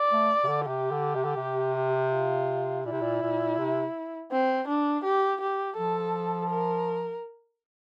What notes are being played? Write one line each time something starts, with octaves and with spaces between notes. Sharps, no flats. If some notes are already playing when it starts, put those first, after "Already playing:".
Already playing: D5
A3
C3
D3
C3 G4
D3
C3
D3
C3
F4
A#2 E4
C3
A#2
A#2
C3
C4
D4
G4
G4
F3 A4
A#4